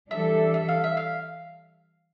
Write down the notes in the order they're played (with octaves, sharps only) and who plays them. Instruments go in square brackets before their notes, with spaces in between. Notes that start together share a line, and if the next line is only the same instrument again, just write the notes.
[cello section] E3 G3 D4 A4 [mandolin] E5
[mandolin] E5
F5
E5
F5